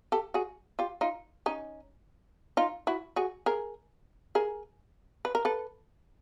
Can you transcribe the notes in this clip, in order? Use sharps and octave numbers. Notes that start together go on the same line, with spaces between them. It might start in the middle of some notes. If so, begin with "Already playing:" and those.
G4 A4
F#4 G#4
F4 G4
D#4 F4
C#4 D#4
D#4 F4
E4 F#4
F#4 G#4
G#4 A#4
G#4 A#4
B4
A#4
A4 B4